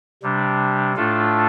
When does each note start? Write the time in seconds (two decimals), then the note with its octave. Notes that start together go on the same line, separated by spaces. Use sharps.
0.23 C3 G3 D4
0.96 A2 A3 D4 F4 A4